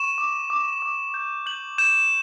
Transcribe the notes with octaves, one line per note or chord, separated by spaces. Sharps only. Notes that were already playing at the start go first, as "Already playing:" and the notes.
Already playing: C#6 E7
D6
D6
D6
G6
G6 F#7
G6 E7